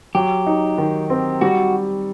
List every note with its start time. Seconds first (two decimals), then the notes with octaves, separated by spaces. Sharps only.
0.15 F#3 G4
0.47 D#4
0.78 D#3
1.10 C4
1.41 G3 F#4